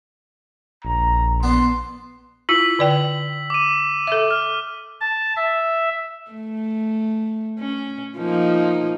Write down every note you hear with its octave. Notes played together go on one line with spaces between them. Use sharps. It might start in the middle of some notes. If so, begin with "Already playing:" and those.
A#1 A#5
B3 D4 C6
E4 F4 E6 B6 F#7
D3 D5 G5
D6 D#7
A4 E5
F6
A5
E5
A3
C#4
F3 A#3 D#4